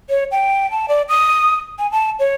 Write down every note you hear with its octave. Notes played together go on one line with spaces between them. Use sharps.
C#5
G5
A5
D5
D#6
G#5
A5
C#5